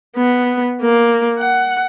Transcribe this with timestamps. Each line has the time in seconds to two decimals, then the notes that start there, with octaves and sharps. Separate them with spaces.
0.16 B3
0.81 A#3
1.38 F#5